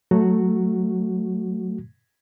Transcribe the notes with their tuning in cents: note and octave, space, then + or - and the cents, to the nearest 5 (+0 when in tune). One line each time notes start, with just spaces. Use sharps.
F#3 +0 A3 +0 F#4 +0